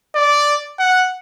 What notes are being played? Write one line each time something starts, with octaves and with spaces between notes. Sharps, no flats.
D5
F#5